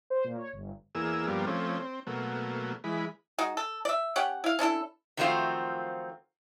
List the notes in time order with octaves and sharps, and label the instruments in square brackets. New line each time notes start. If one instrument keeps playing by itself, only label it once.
[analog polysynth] C5
A#2
C#5
G1
[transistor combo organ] E2 A#3 G#4 E6
G2 F3 G3 A#3 B3
F3 A3 C4 C#4
C4
B2 F#3 A3 A#3
E3 G#3 B5
[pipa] G#3 D#4 F#4
A4
D5 E5
C#4 G4 C#5 F#5
E4 F5
C#4 D4 E4 A4
[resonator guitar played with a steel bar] D#3 F3 F#3 A3 C4 F4